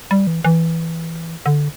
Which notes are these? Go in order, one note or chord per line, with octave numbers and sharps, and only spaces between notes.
G3
E3
E3
D3